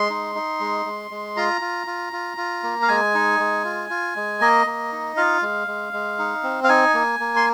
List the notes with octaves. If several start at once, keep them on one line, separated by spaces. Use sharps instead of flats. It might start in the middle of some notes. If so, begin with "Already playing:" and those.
Already playing: G#3 C6
D#4
D#4
G#3
G#3
G#3
F4 A#5
F4
F4
F4
F4
A#3
F5
G#3 G#5
D#4
G#3
F4
F4
G#3
A#3 D#5
A#3
D#4
F4 F5
G#3
G#3
G#3
D#4
C4
F5
D#4 G#5
A#3
A#3
C6